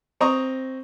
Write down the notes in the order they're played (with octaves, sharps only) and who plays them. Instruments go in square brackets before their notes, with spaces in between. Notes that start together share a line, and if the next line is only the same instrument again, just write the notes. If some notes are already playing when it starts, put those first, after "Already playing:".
[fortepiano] C4 D#5 A#5 C#6 D#6